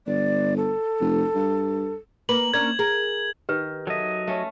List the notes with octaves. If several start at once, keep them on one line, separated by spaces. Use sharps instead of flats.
G1 D5
A4
F1
G2
A#3 B4 F#7
A#3 C#4 D4 G#6
G#4 A#4
D#3 G4 B4
F#3 A4 D#5 E5
A3 C#4